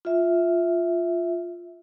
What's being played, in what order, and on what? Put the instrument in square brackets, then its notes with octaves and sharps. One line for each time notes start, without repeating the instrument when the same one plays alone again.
[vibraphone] F4 E5